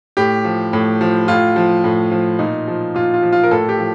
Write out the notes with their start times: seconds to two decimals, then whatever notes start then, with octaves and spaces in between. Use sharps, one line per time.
0.17 A2 G4
0.44 F3
0.73 A2
1.01 F3
1.28 A2 F4
1.56 F3
1.84 A2
2.11 F3
2.39 A#2 D#4
2.68 F3
2.94 A#2 F4
3.14 F4
3.22 F3
3.32 F4
3.43 A#4
3.51 A2 A4
3.69 G4
3.79 F3